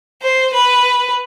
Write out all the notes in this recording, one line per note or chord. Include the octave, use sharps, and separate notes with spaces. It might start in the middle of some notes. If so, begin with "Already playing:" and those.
C5
B4